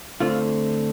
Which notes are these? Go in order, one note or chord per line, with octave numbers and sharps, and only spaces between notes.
D3 A3 C4 F4